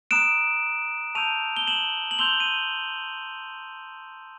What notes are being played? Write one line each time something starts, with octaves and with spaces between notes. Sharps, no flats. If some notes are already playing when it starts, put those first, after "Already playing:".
A#5 D#6 F#6 D7 E7
A5 C#6 E6 G6 D#7 F7
G7
E7 F#7
F#7
C6 E6 G6 F7 G7
D#7